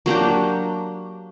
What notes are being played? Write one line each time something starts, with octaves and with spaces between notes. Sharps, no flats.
F#3 A#3 D4 G4